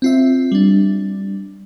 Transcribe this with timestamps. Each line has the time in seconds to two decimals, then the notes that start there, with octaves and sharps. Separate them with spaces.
0.02 C4 F4 E5
0.52 G3 D4